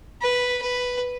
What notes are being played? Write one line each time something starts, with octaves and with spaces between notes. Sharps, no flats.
B4
B4